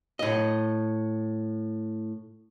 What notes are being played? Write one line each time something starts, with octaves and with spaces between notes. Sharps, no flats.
A2 D#5